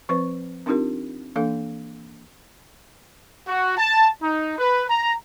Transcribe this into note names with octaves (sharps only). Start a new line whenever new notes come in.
F3 C4 B4 C5 C#6
C4 D4 D#4 F4 G4 A#4
E3 A#3 D4 A4 F5
F#4
A5
D#4
B4
A#5